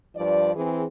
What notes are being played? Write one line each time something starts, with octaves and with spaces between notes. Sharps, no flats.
G2 F3 D5
E3 C4 G#4